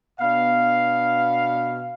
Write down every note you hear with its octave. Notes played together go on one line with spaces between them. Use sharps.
B2 B3 D4 F5